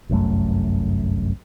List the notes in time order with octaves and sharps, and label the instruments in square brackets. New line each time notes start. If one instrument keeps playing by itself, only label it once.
[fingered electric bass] G1 C2 F#2 A3